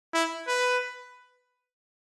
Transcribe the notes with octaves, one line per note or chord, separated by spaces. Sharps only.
E4
B4